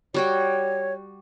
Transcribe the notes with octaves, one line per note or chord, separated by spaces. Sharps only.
G3 F#4 C#5 G5